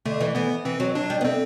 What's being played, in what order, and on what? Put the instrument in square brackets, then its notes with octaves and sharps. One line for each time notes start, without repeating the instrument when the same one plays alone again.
[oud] D3 [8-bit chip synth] A3
[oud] E3
[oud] E3 [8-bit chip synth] B3
[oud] E3 [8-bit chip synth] C4
[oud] F#3
[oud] F#3 [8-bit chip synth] D4
[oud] G3
B3
[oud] A3 [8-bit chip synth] C4